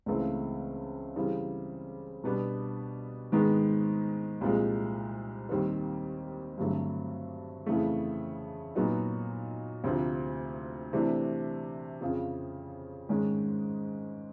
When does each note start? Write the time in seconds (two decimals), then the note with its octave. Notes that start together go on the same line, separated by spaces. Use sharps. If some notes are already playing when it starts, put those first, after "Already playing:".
0.06 C#2 C#3 E3 A3 C4
1.16 C#3 E3 G3 C4
2.24 B2 G3 B3 D4
3.32 G#2 D#3 G#3 B3
4.41 C2 A#2 F3 G#3
5.49 D#2 D#3 G3 C4
6.58 G2 D3 F#3 A3 C4
7.66 F2 C#3 E3 A3
8.75 A#2 F#3 B3 D#4 F#4
9.84 D2 C3 F3
10.93 C3 E3 A3 D4
12.01 F2 C#3 F3
13.09 G#2 D#3 G#3 C#4